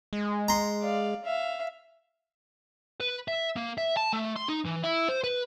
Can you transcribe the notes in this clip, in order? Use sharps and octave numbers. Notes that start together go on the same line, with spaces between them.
G#3
A#5 C6
D5 F5
E5 F5
B4
E5
A#3
E5
A5
A3
C6
D#4
E3
E4
C5
B4